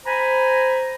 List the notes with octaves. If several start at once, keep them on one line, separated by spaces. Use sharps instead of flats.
C5 G#5 A#5 B5